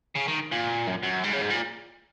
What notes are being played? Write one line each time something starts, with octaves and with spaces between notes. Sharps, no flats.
C#3
D#3
A#2
F#2
F#2
G#2
C#3
G#2
A#2